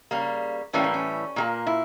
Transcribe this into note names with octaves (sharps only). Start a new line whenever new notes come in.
C#3 G3 A#3
A2 E3 G3 A#3 C#4
A#3
C#4
A#2 G3 A#3
E4